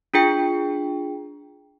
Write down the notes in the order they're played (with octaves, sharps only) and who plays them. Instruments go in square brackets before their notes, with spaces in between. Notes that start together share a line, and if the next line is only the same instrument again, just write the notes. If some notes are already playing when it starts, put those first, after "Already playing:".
[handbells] D4 F4 G#4 G5